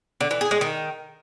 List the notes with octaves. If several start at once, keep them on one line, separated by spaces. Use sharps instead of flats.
D3
E3
G#4
G#3
D#3